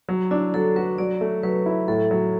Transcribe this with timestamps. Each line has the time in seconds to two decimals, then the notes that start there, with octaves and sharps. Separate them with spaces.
0.09 F#3
0.31 D4 E4
0.54 F#3 A4
0.76 F#4 B4
0.98 F#3 D5
1.21 A3
1.43 F#3 B4
1.66 E4
1.88 A2 A4
2.11 F#3